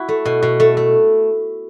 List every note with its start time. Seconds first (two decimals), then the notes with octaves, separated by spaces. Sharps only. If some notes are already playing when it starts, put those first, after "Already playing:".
Already playing: E4 F#4
0.09 A3
0.25 B2
0.43 B2
0.60 A3
0.77 A3